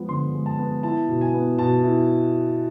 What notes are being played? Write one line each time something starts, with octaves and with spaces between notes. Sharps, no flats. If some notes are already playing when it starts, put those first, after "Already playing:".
Already playing: F3 G#3 B3
D3 C6
G#3
A5
B3
E4 A5
B2
G#5
B3
B2 A5
E4